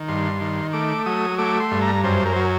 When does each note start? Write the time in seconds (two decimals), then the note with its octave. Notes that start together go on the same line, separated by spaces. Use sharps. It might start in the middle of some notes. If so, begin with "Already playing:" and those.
Already playing: D#3
0.08 G2 C6
0.41 D#3
0.73 A3 D6
1.06 F#3 D#6
1.38 A3 D6
1.60 C6
1.71 G2
1.82 A#5
2.04 F#2 C5
2.25 A#4
2.33 C5
2.36 F#3 A#4